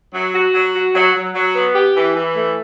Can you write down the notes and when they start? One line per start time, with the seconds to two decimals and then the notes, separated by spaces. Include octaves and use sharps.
0.14 F#3
0.34 F#4
0.55 F#3
0.75 F#4
0.95 F#3
1.14 F#3
1.35 F#3
1.55 B3
1.75 G4
1.96 E3
2.16 E3
2.36 A3